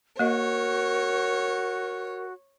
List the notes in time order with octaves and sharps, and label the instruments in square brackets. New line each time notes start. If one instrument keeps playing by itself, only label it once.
[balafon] A#3 D#5 [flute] F#4 [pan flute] A#4 [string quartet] C#5